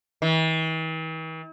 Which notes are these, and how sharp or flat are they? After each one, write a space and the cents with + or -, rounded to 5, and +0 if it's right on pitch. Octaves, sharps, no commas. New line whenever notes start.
E3 -45